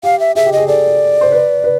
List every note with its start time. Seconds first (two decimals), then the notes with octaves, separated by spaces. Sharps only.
0.03 G4 F5
0.20 E5
0.35 G#4 E5
0.46 G4
0.53 G#4 D#5
0.68 A4 D5
1.21 C5
1.32 B4
1.64 B4